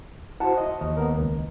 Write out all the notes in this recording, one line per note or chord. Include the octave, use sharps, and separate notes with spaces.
E4 F#4 C5 F#5 A5
D#5
D#2
B3 A#4
C#2